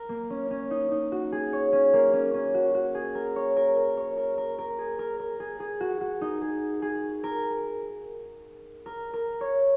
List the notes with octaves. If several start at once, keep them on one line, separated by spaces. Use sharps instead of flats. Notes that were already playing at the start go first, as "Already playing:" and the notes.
Already playing: A#4
A#3
C#4
C#4
D#4
D#4
F#4
G#4
C#5
C#4
A#3
C#4
C#4
F#4
F#4
G#4
A#4
C#5
A#4
A#4
C#5
A#4
A#4
A#4
G#4
A#4
A#4
G#4
G#4
F#4
F#4
D#4
G#4
G#4
A#4
A#4
A#4
C#5